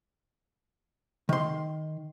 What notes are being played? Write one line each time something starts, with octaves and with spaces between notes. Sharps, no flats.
D#3 C6